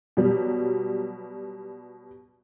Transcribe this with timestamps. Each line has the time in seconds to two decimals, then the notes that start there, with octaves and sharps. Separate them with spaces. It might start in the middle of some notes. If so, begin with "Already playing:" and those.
0.17 B2 F#3 G3